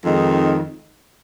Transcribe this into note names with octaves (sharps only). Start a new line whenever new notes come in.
F2 D#3 G#3 D#4